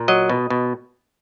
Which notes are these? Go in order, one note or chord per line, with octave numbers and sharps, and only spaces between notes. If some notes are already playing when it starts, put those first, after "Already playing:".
Already playing: A#2
F#3 D#5
B2
B2